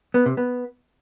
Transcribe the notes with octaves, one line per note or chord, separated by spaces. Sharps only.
B3
C3
B3